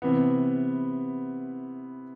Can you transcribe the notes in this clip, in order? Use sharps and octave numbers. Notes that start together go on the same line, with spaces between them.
C3 E3 B3